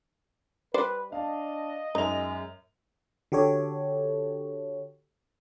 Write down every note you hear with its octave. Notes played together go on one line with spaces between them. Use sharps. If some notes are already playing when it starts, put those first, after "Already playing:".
G3 B4 C5 D5
D4 D#5 F5 A5
F#2 G#3 D#4 E5 F7
D3 F#4 G4 A4 C#5